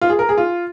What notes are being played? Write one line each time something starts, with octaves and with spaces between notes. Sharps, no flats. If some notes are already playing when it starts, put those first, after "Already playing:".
F4
G#4
A#4
G#4
F4